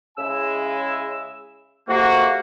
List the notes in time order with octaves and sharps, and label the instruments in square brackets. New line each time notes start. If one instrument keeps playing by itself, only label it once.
[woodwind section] C#3 E6 [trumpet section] G#3 E4 G#5
[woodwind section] F2 C3 A#3 [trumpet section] F#4